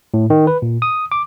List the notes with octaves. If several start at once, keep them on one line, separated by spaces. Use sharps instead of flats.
A2
D#3
B4
A#2
D#6
D6